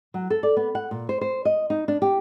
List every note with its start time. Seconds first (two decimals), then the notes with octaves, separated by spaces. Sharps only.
0.14 F#3
0.30 A4
0.43 D5
0.57 B3
0.75 F#5
0.91 A#2
1.09 C5
1.21 C5
1.45 D#5
1.70 D#4
1.88 D4
2.02 G4